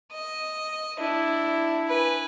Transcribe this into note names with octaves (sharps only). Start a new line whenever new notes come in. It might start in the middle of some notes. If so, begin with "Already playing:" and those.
D#5
D4 E4
B4 G#5